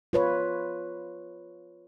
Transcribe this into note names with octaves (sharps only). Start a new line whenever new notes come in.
F4 B4 C#5